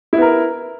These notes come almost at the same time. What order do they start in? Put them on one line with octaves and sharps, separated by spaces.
E4 B3 A#4